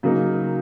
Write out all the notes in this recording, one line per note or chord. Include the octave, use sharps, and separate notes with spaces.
C#3 F#3 A#3 D#4